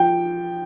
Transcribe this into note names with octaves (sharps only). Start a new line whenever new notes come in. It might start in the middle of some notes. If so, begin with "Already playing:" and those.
Already playing: F3 G5